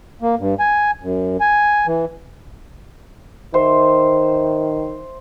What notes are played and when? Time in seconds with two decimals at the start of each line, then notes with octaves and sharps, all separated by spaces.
0.22 A#3
0.39 G2
0.59 G#5
1.03 F#2
1.40 G#5
1.87 E3
3.54 D#3 C5 E5